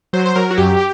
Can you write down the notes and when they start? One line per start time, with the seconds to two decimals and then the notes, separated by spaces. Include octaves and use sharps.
0.13 F#3 C5
0.25 C5
0.35 F#3 A#4
0.51 F#4
0.57 F#2 G4